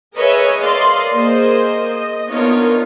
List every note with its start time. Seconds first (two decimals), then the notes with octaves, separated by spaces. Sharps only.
0.14 G#4 A#4 B4 C#5 D#5 E5
0.61 A#4 D5 D#5 F5 C6
1.13 A#3 G#4 C5 D#5
1.87 D#5
2.28 B3 D4 D#4 F4 A#4 C#5